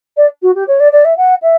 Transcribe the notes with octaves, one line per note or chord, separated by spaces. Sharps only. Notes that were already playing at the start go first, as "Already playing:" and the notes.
D5
F#4
G4
C#5
D5
D5
E5
F#5
E5